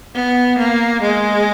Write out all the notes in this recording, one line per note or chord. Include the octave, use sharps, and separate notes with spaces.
B3
A#3
G#3